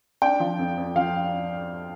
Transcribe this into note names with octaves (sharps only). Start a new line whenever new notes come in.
D4 G5
F3
F2
F2
F3 F5